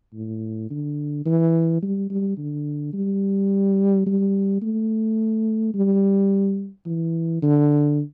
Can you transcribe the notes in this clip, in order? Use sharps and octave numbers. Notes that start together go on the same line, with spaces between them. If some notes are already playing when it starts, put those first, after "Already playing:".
A2
D3
E3
G3
G3
D3
G3
G3
A3
G3
E3
D3